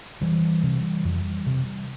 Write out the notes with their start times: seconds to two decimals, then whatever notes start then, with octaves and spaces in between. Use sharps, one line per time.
0.21 F2 E3 G3
0.63 C3
1.05 F2
1.46 C3